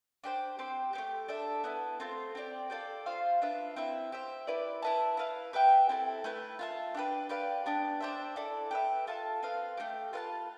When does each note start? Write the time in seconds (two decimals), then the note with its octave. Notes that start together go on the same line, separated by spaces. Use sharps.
0.24 D4 G4 C5
0.59 C4 G4 C5
0.93 C4 G4
0.98 A3
1.28 D4 A4 E5
1.64 B3 E4 A4
2.00 A3 C4 F4
2.35 C4 G4 D5
2.70 F4 A4 D5 G5
3.06 F4 C5 F5
3.42 D4 F4 B4 E5
3.76 C4 E4 B4 E5
4.12 G4 C5 E5
4.47 E4 B4 D5
4.82 E4 B4 E5 A5
5.17 E4 B4 F5
5.53 G4 B4 E5 G5
5.89 C4 E4 A4
6.24 A3 E4 B4
6.59 F4 B4 E5 A5
6.95 D4 G4 B4
7.29 G4 B4 D5 F5
7.66 B3 D4 G4
8.00 D4 G4 C5 E5
8.36 E4 A4 D5
8.71 G4 B4 E5
9.07 F4 A4 E5 A5
9.42 C4 F4 B4 F5
9.77 A3 E4 G4
10.13 F4 B4 F5 A5